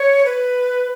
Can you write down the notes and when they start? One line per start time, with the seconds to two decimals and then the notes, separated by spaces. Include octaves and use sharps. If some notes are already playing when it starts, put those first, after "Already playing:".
Already playing: C#5
0.25 B4